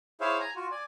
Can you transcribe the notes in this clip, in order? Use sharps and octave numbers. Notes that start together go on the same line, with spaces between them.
E4 G#4 C5 C#5 E5 F5
G#5 A#5
F4 F#4
D5 G#5